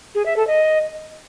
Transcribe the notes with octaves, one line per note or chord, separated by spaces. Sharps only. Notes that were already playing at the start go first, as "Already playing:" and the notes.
G#4
E5
A4
D#5